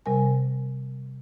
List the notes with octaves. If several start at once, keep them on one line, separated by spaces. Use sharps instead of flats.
C3 G3 A#4 G#5